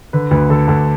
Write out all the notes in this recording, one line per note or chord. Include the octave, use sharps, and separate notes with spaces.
D3 B4
D2 B4
D3 A4
D2 A4